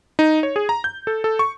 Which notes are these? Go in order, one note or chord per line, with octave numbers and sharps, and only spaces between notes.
D#4
C#5
G#4
A#5
G6
A4
A4
C#6